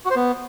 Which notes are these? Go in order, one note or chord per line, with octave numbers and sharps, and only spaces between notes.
F#4
C5
B3